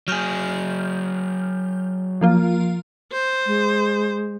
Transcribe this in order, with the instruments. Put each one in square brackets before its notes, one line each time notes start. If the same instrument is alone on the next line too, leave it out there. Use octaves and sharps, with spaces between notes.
[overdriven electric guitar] F#3 G#4 [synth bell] F6 G6
[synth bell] F3 A#3 F4
[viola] C5
[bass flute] G#3